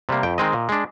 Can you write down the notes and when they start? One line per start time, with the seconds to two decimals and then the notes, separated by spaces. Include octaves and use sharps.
0.09 C3 G3 A#3
0.23 F2 G5
0.38 D#3 G#3 C4 D#5
0.53 A#2
0.69 G#3 D4